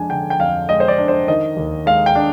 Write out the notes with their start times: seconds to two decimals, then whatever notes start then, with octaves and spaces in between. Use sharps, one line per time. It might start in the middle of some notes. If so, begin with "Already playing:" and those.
Already playing: F2 G#3 D4 G#5
0.10 D3 G5
0.30 G5
0.39 F2 F5
0.69 G#3 D#5
0.80 C5
0.88 D5
0.98 D4
1.08 C5
1.28 D#3 D#5
1.57 D#2
1.86 G#3 F5
2.06 G5
2.15 D4